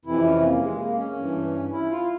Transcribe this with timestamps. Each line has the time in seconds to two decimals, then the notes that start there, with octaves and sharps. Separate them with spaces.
0.05 F2 C3 E3 E4
0.24 C#4
0.43 A#3
0.61 G#3
0.80 A#3
0.98 C#4
1.17 G2 E3
1.73 E4
1.91 F4